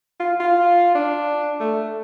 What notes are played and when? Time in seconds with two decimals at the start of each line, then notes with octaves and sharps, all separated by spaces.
0.20 F4
0.40 F4
0.95 D4
1.60 A3